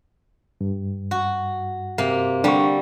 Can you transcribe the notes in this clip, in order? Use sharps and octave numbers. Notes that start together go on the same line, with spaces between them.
G2
F#4
C3 A#3
D3 G3 D4 C#6